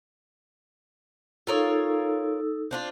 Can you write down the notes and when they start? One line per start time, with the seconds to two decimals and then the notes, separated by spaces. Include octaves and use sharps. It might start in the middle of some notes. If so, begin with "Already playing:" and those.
1.47 D#4 F4 A4 A#4 C#5 E6
2.71 C4 D4 F4